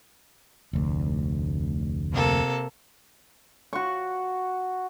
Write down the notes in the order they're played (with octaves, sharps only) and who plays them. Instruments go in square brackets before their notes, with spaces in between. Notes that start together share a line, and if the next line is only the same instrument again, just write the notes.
[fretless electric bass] F1 D2
[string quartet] C3 A#3 A4
[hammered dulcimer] F#4 C#6